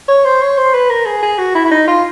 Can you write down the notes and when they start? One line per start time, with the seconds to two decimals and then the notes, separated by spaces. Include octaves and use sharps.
0.08 C#5
0.25 C5
0.42 C#5
0.58 C5
0.74 B4
0.90 A#4
1.06 G#4
1.23 G#4
1.39 F#4
1.55 E4
1.65 E4
1.72 D#4
1.88 F4